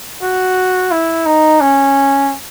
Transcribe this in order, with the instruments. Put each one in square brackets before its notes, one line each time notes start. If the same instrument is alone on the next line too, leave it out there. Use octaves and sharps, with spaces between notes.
[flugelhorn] F#4
E4
D#4
C#4